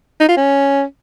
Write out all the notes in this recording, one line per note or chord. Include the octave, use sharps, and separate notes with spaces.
D#4
F4
C#4